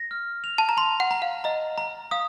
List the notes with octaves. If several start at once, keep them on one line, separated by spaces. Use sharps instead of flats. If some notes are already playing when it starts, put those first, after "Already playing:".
Already playing: A#6
F6
F7
A5
A#5
C6 F7
F#5
A#5
F5
D#5 A#5
A#5
F5 D#6